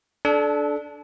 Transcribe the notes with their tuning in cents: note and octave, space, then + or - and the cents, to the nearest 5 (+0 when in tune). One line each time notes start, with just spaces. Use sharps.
D4 +0 A4 -25